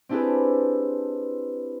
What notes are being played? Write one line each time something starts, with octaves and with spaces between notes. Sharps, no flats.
C4 D4 E4 G4 G#4 B4